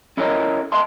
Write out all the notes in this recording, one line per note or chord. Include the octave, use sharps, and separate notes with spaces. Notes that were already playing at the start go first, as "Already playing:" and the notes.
C#4 E4 A4 A#4 C#5 D#5
D#5 E5 A5 C6